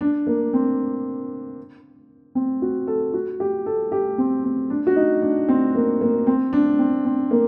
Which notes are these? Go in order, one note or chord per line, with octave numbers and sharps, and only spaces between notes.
D4
A#3
C4
C4
F#4
A4
F#4
G4
A4
G4
C4
C4
D4
F#4
D#4
D4
C4
A#3
A#3
C4
D4
C4
C4
A#3